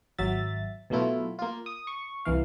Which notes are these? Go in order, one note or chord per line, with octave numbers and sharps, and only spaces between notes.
G#1 F#3 E5 A6
B2 F#3 A3 E4 F4
A#3 F4
D#6
C#6
C2 E3 F5